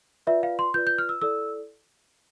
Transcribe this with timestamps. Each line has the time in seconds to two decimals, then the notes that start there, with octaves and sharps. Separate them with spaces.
0.27 F4 B4 D5 E5
0.43 F5
0.59 C6
0.74 F4 B4 D5 G6
0.87 G6
0.98 F6
1.09 E6
1.22 E4 A4 D5 E6